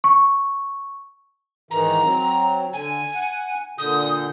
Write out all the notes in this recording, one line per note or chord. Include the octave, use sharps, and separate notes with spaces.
C#6
G#2 D#3 E3 A#5
F#3 C4
D3 G#5
F#5
A#2 D3 D#6 G6